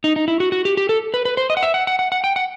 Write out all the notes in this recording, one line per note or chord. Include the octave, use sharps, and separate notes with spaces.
D#4
D#4
E4
F#4
F#4
G4
G4
A4
B4
B4
C5
D#5
F#5
E5
F#5
F#5
F#5
F#5
G5
F#5